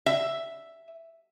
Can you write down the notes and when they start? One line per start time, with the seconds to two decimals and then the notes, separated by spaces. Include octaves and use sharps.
0.06 E5